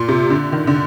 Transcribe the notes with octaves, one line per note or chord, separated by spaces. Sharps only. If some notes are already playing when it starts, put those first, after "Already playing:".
Already playing: A#2
C3
D3
D#3
D3